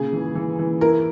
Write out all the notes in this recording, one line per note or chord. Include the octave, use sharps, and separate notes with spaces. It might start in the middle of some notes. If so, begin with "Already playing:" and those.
Already playing: A#2 C#3 G#4
E3
E3
E3
E4 A#4